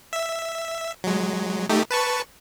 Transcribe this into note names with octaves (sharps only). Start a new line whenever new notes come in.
E5
F#3 G#3
A3 D#4 G4
B4 A5 C#6